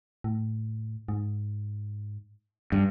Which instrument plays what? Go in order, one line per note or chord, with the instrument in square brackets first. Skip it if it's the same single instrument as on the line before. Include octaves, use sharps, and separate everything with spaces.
[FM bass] A2
G#2
[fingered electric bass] G2